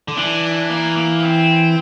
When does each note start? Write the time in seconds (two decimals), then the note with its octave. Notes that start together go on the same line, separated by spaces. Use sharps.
0.08 D3
0.17 E3 D4
0.70 A#3
0.96 A#3
1.22 C4